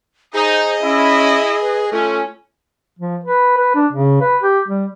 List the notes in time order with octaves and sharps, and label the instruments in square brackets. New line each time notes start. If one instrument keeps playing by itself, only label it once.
[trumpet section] D#4 [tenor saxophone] G#4 [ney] C5 [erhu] D#5
[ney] C#4 [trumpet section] E4
[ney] B4
[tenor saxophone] A3 [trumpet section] C#4 [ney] F4
[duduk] F3
B4
B4
D4
C#3
B4
G4
G3